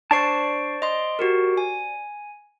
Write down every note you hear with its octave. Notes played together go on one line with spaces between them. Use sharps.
D4 C5 D5 A5 C#6 C7
D#5 C6
F#4 G4 A#4
G#5